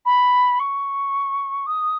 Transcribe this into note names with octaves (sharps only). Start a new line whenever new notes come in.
B5
C#6
D#6